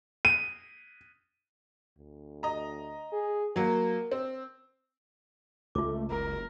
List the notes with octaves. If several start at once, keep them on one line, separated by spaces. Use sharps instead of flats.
D#7
D2
D#5 A#5
G#4
F#3 A#3 A#4
C4
C#2 A3 F4 D6
F#1 A#4